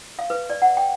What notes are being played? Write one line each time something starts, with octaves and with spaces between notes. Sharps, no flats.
F5
B4
D5
F#5
G5